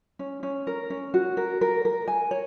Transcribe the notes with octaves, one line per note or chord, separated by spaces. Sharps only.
C#4
C#4
A#4
C#4
F#4
A#4
A#4
A#4
G#5
C#5